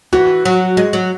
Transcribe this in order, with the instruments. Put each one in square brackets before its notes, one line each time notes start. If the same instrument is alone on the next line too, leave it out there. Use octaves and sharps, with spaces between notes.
[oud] E3 [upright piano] F#4
[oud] F#3
G#3
F#3